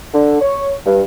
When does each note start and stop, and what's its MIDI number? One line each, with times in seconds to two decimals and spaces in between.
0.13 0.38 50
0.41 0.72 73
0.86 1.02 43